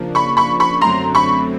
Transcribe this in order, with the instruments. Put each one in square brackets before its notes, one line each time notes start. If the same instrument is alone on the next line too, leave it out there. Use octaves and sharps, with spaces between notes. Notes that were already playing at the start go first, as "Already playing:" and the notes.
Already playing: [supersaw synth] C#3 F3 A#3 D4
[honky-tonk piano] B5 C#6
B5 C#6
B5 C#6
[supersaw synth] F#2 D3 F#3 A3 C4 [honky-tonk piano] A#5 C6
[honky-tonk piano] B5 C#6